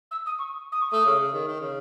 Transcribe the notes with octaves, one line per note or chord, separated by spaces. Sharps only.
E6
D#6
C#6
D#6
C#6
A3 D#6
C#3
C#3
D#3
D#3
C#3